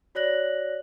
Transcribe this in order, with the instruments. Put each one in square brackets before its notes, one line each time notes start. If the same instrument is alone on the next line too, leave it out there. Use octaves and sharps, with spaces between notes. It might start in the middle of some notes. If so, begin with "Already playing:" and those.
[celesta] F#4 C#5 D5 F#6 A#6 F#7